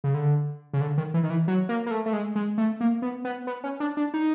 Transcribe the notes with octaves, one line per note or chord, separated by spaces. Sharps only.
C#3
D3
C#3
D3
D#3
E3
D#3
E3
F#3
A#3
A#3
A3
A3
G#3
G#3
A3
A#3
B3
B3
B3
C#4
D4
D4
D#4